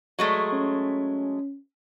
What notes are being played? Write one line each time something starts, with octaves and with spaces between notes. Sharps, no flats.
F#3 G#3 A3
C#4